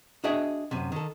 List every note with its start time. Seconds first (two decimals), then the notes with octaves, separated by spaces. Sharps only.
0.24 D4 F#4 G#4 D#5 E5 G5
0.71 F#2 C3
0.92 D#3 A4